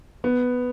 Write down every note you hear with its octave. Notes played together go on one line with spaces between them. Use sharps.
B3